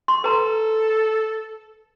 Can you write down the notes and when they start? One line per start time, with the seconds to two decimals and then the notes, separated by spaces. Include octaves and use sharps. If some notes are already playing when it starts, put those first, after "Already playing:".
0.08 C6
0.24 A4 B4 A#5